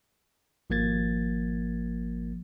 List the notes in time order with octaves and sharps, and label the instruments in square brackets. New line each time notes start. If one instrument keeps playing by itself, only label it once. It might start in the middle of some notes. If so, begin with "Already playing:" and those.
[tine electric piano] G#1 F3 A#3 G#6 A6